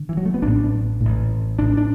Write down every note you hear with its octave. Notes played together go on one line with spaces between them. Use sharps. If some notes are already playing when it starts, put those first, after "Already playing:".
Already playing: D3 B3
E3
F#3
A3
B3
A1 A2 D4
A1 A2
A1 A2 D4
D4